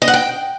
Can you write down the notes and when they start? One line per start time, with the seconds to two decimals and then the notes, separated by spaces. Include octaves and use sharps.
0.02 D#5
0.08 F#5
0.14 G5